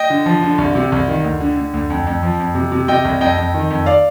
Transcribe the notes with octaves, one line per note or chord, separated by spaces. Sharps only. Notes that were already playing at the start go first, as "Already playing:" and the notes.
Already playing: D#5 G5
D3
F3
D3
C2
C3
C2
D#3
D2
D3
D3
D2
F2
F2
F3
F2
C3
C3
C3 D#5 G5
C2
F2 D#5 G5
F2
D#3
F2
D5 F5